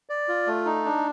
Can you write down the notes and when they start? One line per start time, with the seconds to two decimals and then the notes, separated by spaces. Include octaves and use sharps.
0.09 D5
0.28 F4
0.47 A3
0.66 D#4
0.85 D4